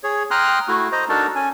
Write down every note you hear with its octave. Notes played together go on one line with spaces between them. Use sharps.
G#4 C#5
G5 A#5 C6 D#6 F6 F#6
A3 E4 F#4
C5 D#5 A#5
D4 D#4 F#4 A4 A#4 A5
C#4 G#5